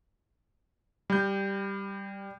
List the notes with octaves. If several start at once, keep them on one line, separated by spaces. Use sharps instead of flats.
G3 G6